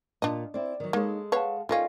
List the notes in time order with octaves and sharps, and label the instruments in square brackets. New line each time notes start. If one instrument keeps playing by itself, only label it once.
[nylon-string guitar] A#2 F4 [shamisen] D4 D#5
[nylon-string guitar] C4 E4 [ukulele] D5
[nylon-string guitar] D#3 F#3
[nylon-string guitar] G#3 A4 [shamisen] A#3 [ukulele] D#4 C#5
[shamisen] B4 C#5 [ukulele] F5 F#5 A5
[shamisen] D#3 G3 C#4 [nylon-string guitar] F4 [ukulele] A4 D#5 F5